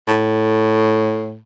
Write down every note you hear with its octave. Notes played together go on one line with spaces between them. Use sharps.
A2